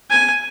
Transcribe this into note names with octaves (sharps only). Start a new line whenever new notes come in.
G#5